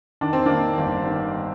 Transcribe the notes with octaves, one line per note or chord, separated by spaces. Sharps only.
D#3 D4
C4
D#3 A#3 D4
G1
D#3